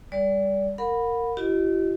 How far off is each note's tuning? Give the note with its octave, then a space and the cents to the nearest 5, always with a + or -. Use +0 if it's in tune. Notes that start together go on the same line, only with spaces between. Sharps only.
G3 +20 D5 -30
A#4 -15 F#5 -35 B5 +0
E4 +35 G4 -40 D#5 +0